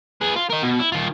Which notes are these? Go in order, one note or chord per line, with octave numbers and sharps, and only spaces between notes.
G#4 B4
F4
A#4 D#5
B2
E4
D#3 F4